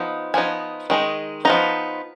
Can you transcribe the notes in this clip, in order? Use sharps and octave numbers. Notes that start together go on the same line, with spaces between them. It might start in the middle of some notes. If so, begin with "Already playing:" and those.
Already playing: F3 B3 D#4
F3 B3 D#4 G#5
D#3 G#3 D#4
F3 B3 D#4 A#5